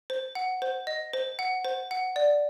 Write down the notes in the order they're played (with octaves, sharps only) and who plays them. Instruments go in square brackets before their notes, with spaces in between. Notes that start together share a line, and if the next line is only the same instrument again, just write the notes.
[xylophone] C5
F#5
C5
D#5
C5
F#5
C5
F#5
D5